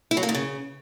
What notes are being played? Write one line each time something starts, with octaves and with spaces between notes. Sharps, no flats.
E4
F#3
A#3
D#3
C#3